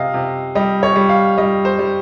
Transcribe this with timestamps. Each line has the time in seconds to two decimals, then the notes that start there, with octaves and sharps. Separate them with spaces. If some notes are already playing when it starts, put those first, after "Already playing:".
Already playing: C3 D#5 F5
0.14 C3
0.55 G3 D#5
0.83 C#5
0.96 G3
1.09 F5
1.38 G3 D#5
1.65 C5
1.79 G3